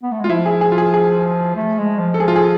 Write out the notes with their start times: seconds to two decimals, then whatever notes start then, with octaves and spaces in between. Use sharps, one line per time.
0.03 B3
0.12 A3
0.20 G#3
0.24 F4
0.29 F3 E4
0.46 G#4
0.61 G#4
0.72 F4
0.78 G#4
0.94 G#4
1.56 A3
1.78 G#3
1.99 F3
2.14 A4
2.20 F3 G#4
2.28 F4
2.36 G#4